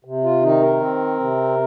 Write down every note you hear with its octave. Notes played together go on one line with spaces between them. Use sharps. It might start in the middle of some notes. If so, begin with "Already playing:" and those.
C3
F4
D#3 D#4
A#4
C4
C3